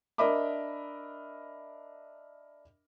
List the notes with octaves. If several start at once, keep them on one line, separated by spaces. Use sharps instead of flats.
D4 A#4 D#5 E5 B5 D6